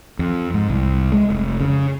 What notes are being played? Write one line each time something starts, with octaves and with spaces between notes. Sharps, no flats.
F2
G#2
C2
G#3
F1
C#3